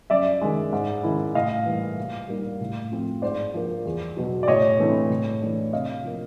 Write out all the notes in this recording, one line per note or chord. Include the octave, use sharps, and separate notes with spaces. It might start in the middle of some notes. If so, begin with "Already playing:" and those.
F#2 D5 E5
D#3 G#3
G#2
D#3 G#3 C#4 E4
A2 D#5 F5
E3 G3 A#3
A#2
G3 A#3 D#4
A2
F3 A3 C4
G#2 C5 D5
F3 A#3
E2
B2 F#3
D5
A2 C#5 D#5
E3 A3 C4 E4
A2
E3 A3 D4
C3 D#5 F5
F3 A#3